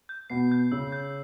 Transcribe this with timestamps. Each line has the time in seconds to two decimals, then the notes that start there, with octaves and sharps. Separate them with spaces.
0.09 G6
0.30 B2 B3 C7
0.52 G6
0.72 C#3 C#4 E6
0.92 G6